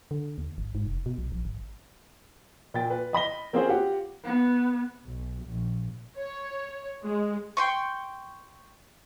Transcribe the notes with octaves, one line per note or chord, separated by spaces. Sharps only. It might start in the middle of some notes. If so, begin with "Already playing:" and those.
D3
D#2
G#1
G#2
F1
B2
B1
A#1
G#1
A#2 G5 A6
B4
D#5 B5 A#6 G7
A#3 C4 C#4 F4 G#4 C5
F4 G4 F#5
B3
B1
A#1
C#5
G#3
G5 C6 C#6